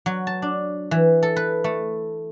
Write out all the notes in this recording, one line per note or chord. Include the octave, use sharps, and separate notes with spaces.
F#3
A5
D4
E3
A4
B4
A3